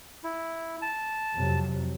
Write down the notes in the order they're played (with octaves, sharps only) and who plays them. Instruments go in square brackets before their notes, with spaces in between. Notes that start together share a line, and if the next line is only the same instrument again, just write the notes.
[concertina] E4
A5
[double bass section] F2 C3 F#3